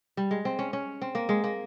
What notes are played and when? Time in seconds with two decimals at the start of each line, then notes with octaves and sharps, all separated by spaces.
0.17 G3
0.31 G#3
0.45 C4
0.59 C#4
0.73 C#4
1.01 C4
1.15 A#3
1.29 G#3
1.44 A#3